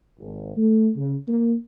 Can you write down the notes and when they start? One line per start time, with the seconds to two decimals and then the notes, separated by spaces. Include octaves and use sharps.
0.19 G#1
0.55 A3
0.95 C#3
1.26 A#3